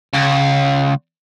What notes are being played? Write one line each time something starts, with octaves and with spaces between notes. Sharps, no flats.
C#2